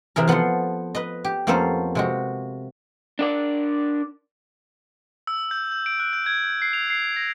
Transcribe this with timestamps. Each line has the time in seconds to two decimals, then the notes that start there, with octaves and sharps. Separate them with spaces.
0.16 C3 E3 G#4 A#4
0.28 F3 B3 A4 F#5 C6
0.95 B4 D#5
1.24 G4
1.47 F2 A#3 B3 C#4 A4 C5
1.95 C3 G#3 F#4
3.19 D4 A#4 D5
5.27 E6
5.51 G6
5.72 G6
5.86 D7
6.00 F#6
6.13 G6
6.26 G#6
6.44 G6
6.62 C7
6.73 F7
6.90 C7
7.16 A#6